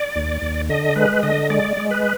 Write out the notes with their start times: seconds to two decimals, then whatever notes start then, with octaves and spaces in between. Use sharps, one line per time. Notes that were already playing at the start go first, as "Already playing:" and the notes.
Already playing: D5
0.16 D#2
0.42 D#2
0.69 D3 D#5
0.96 G#3 B4
1.23 D3 D#5
1.50 G#3 D5
1.77 G#3
1.91 B4